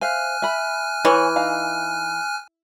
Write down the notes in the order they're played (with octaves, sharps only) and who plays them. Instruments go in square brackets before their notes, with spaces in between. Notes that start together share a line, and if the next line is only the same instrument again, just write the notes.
[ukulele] C5 E5 F5 [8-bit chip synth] G#5 F6 F#6
[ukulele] E5 B5
[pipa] E3 [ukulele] C#5
[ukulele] D#4 F5 A#5